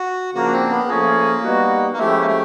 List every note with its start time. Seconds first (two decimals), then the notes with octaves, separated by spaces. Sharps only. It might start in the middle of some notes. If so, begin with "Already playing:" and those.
Already playing: F#4
0.34 C#3 F3 A#3 D4 F#4
0.53 C4
0.71 B3
0.89 F3 A3 A#3 C#4 F4 G#4
1.44 G3 B3 D#4 F#4
1.93 A#3
1.98 F3 G#3 A3 C#4 E4 G4
2.21 A#3
2.27 A3